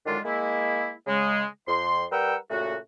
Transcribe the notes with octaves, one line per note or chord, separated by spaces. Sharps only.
F#2 D3 D#3 G#3 D4 F4
G#3 A#3 E4
C#3 G#3
F2 C6
G3 A#4 B4 F#5 G5 E6
A#2 C#3 A3 F#4